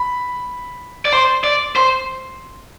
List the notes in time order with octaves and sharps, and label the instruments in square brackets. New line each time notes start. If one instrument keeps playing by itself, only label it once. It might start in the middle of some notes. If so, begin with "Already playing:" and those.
Already playing: [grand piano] B5
[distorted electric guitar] D5
[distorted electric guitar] C5 [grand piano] C6
[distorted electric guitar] D5
[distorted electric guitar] C5 [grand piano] C6